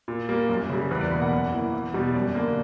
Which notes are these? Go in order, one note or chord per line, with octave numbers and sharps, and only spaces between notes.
A#2
G3 A#3
F#2
C#3 G3
E2 B4
D5
B2 A#3 B5
F#5
F#2
E3 A#3
E2
B2 G3
F#2 D5
D3 A#3